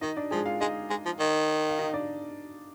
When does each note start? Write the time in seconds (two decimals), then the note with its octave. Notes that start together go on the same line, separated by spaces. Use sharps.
0.01 D#3 D#4 D#5
0.17 D4 D5
0.31 F3 G#3 G#4
0.46 F4 F5
0.61 G#3 D#4 D#5
0.90 G#3
1.05 F3
1.19 D#3
1.69 F5
1.78 D#4 D#5
1.94 D4 D5